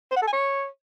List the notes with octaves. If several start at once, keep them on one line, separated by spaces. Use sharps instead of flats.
C5
F#5
A4
G#5
C#5